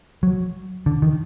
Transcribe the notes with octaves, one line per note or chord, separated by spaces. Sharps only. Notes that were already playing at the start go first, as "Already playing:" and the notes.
F#3
D3
D#3